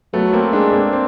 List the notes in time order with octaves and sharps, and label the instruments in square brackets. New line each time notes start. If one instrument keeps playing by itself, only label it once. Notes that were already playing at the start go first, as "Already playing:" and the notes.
[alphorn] F#3 [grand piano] A3 B3
[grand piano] A#3 C4
[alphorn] G#3 [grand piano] C4 D4
[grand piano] A#3 C4
C4